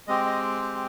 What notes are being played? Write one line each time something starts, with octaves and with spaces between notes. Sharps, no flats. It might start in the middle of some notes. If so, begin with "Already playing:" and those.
G#3 C4 G4 D#5
D#5
G5